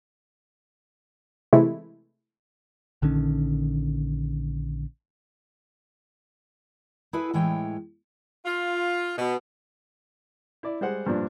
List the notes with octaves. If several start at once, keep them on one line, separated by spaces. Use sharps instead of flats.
C3 E3 G#3 A3 E4
A#1 D3 D#3 C#4
E4 G#4 A4 B4 E5
A2 E3 G#3 C#5 G5
F4
B2
E4 D5
G3 G#3 C5 F#5
G2 A#2 F3 D4